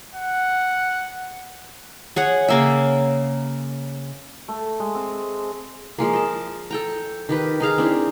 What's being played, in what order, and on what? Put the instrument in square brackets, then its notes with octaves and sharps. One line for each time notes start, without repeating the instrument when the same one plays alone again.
[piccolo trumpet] F#5
[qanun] G#4 C#5 F#5
C#3 A#3 E5
[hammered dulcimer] A3
G#3
C4
[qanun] F3 G#3 A#3
D#5 A5
A4 G5 A#5
D#3 G4 B4
D#4 G#4 F5 A#5
C4 D4 E4